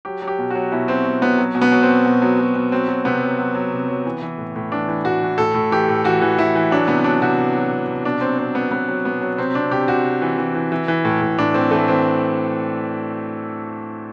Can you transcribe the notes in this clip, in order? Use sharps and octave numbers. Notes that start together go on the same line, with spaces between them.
F#3 G4
F#3
G4
B2
F#3 F#4
B2 E4
F#3 C4
B2
F#3 B3
F#3
B2
B3
F#3
C4
B2
B2
F#3
F#3
B2
F#3 C4
F#3
C3 B3
F#3
F#3
F#3
C3
F#3
E3
E3
A2
A2
E3 D4
E3
A2 F#4
E3
A2 A4
A2
E3 G4
A2
E3 F#4
E3
E3 E4
E3
F#3 D4
C3 B3
F#3 D4
C3 F#4
C3
F#3
C3
C3
B2 D4
F#3 C4
B2 C4
F#3 B3
F#3 B3
F#3
B2 B3
F#3
C3 C4
C3 D4
C3 G4
C3 F#4
C3
E3
E3
E3
E3
E3
A2
A2
A2 D4
A2 C4
E3 A3
E3 C4